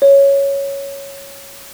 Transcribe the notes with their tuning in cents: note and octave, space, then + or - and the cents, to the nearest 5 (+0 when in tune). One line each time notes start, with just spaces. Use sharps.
C#5 +0